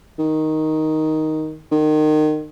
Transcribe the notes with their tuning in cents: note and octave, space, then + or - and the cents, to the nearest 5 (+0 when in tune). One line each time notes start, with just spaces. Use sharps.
D#3 +5
D#3 -25